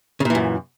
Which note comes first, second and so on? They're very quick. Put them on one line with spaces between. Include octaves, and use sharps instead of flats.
C#3 A#2 E3 F#2